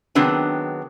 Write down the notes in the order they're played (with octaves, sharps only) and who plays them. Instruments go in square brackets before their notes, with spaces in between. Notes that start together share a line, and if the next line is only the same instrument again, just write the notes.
[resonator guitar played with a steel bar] D#3 F#3 G#3 B3 C4 D4